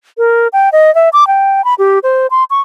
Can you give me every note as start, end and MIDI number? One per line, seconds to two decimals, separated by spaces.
0.18 0.48 70
0.53 0.69 79
0.72 0.93 75
0.95 1.09 76
1.13 1.27 86
1.27 1.64 79
1.65 1.74 83
1.79 1.99 67
2.03 2.27 72
2.31 2.44 84
2.50 2.61 85